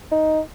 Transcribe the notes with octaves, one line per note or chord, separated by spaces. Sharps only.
D#4